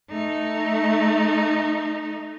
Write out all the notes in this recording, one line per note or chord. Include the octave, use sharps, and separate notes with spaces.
A3 D#4